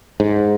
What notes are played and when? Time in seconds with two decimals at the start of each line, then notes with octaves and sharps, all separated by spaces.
0.20 G#2